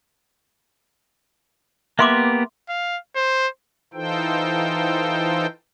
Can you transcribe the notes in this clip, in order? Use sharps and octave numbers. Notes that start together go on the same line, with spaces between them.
A#3 B3 G4 E5 C6 D6
F5
C5
E3 D#4 F4 A4 C5 G5